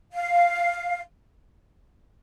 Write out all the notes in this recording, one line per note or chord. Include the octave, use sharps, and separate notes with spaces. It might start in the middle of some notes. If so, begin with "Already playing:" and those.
F5